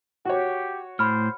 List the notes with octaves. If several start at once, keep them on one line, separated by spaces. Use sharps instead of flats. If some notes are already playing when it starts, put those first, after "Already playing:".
F#4 G4 C#5
A2 C5 B5 F6